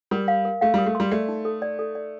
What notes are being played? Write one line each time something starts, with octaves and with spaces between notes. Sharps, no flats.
G3 A#4
F5
A#4
A3 F5
G3
A#4
A3
G3 C6
A3 D5
D#4
A4
D5
A4
D5